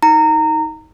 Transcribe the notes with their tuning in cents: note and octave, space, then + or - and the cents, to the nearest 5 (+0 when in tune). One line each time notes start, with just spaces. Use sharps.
D#4 +25 A#5 -20